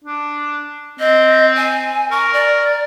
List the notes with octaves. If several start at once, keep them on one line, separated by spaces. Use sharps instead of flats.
D4
C4 D#5
G#5
A#4 C#6
D5